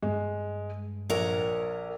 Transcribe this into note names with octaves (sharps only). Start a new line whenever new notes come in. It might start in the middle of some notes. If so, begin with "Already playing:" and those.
G2 G#3
A#1 A#4 C#5 F#5